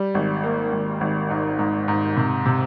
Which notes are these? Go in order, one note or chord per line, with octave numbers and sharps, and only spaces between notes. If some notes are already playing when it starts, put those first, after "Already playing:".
Already playing: G3
G#1
A#3
G#1
G#1
G#2
G#2
G#2
C3
C3